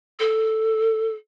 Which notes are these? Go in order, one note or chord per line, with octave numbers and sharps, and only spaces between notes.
A4